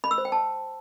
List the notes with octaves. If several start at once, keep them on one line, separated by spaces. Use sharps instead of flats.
B5
E6
C5
G5
A5